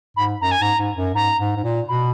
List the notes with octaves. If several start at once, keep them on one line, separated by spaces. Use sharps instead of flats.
G#2 B5
F#2 A#5
G#5
G#2 A#5
G#2
F#2
G#2 A#5
G#2
G#2
A#2
B2 B5